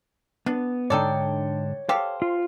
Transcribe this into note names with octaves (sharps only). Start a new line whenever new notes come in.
B3 D4
G#2 D3 D4 D#4 A4 C#5 D5 G5
G4 A4 C5 F5
F4